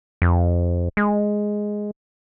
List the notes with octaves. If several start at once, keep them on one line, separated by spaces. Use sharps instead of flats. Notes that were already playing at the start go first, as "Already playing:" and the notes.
F2
G#3